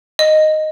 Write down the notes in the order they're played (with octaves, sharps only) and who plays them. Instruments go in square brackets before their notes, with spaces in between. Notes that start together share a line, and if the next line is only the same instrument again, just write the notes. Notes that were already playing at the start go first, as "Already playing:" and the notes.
[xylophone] D#5